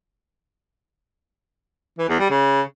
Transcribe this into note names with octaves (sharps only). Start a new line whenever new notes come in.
E3
E2
G3
C#3